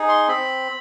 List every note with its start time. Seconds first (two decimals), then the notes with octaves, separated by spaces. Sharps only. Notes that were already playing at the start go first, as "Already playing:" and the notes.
Already playing: D#4 G#4
0.09 C6
0.28 C4 B5